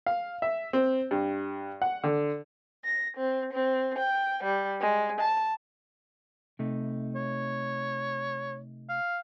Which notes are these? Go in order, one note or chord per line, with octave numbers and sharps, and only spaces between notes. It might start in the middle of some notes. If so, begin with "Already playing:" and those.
F5
E5
C4
G2
F#5
D3
A#6
C4
C4
G5
G3
G#3
A5
C3 A3 D#4
C#5
F5